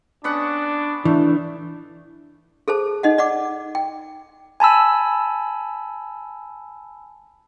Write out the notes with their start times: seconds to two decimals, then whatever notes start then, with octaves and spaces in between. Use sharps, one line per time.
0.24 B3 C#4 D4 F#5
1.05 E3 A3 D4
2.68 G#4 A4 C5 A5
3.03 D#4 D#5 F#5
3.18 D5 F#5 D6
3.75 G5
4.60 G#5 A5 B5 E6